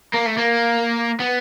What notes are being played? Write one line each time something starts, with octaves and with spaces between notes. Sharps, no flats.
A#3
A3
A#3
B3